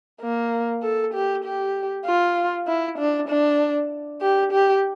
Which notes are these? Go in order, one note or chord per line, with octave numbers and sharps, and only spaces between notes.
A#3
A4
G4
G4
F4
E4
D4
D4
G4
G4